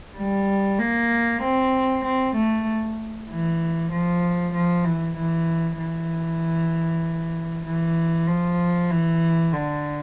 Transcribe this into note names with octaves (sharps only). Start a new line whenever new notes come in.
G3
A#3
C4
C4
A3
E3
F3
F3
E3
E3
E3
E3
F3
E3
D3